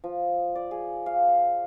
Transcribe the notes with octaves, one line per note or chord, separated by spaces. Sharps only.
F3
D5
G#4
F5